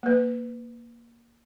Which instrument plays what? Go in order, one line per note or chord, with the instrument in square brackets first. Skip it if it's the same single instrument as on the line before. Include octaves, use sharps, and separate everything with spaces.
[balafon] A#3 B4